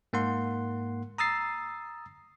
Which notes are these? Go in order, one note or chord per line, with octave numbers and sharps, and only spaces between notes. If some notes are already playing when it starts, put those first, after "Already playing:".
G#2 A#3 F#5 C6
A#5 D#6 E6 A6 C7